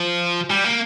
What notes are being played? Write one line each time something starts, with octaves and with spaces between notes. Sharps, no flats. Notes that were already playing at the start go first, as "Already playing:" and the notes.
Already playing: F3
G3
A#3